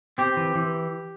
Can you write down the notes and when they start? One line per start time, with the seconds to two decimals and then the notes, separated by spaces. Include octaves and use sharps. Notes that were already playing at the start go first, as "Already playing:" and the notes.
0.18 C4 G4
0.37 E3
0.55 E3